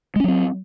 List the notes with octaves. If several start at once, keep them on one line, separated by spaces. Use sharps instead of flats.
F#3 G#3 C4 C#4